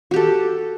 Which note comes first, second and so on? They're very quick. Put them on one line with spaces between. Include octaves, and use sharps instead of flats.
F#4 G4 A4